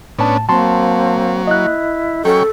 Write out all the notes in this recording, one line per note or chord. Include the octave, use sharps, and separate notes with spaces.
A2 B3 C#4 D4 A5
F#3 A#3 C4 A5 C6
E4 D#5 F#6
F#3 C#4 A4 G5 C#6